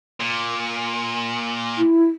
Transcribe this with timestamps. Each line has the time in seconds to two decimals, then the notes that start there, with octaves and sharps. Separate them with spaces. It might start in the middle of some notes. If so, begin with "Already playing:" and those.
0.20 A#2
1.78 E4